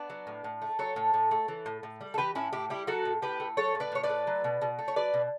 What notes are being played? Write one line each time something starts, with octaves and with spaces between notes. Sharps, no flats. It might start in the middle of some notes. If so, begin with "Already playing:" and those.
Already playing: B3 D4
F#3
A2
A2
A3
F#3 A4 C#5
A2
A2
A3
E3
A2
A2
G3
A4
E3 G4 B4
A2 C#4 E4
A2 E4 G4
G3 E4 G4
F#3 F#4 A4
A2
A2 G4 B4
A3
F#3 A4 C#5
A2
B4 D5
A2 C#5
B4 D5
A3
F#3
B2
B2
A3
C#5
F#3 B4 D5
B2